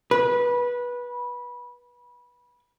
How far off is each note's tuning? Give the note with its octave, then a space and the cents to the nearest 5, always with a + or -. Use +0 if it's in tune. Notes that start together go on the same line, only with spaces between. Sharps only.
B4 -20